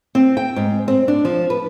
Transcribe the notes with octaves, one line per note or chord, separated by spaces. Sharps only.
C4
G5
G#2
C4
D4
F3
B4